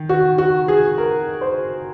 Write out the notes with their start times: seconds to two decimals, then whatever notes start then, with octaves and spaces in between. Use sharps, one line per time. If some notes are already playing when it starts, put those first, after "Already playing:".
Already playing: D#3
0.09 F#4
0.38 F#4
0.68 G#4
0.98 A#4
1.41 C5